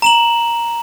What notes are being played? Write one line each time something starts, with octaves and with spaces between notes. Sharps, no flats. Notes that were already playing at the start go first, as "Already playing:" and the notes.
A#5 E7 F#7